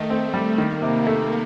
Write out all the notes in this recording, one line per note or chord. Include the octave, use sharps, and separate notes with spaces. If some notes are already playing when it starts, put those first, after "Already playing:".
Already playing: D#3 A3 D#4
C4
G3
D#3 A#3
C3
A3